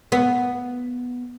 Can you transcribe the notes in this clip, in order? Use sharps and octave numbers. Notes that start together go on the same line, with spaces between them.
B3